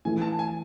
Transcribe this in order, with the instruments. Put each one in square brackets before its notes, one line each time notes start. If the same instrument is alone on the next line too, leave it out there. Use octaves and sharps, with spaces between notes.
[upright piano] E3 A3 E4 [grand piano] G#5
[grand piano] A5
G#5